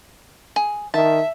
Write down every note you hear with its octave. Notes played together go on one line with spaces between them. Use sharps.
G#4
D#3 E5 A5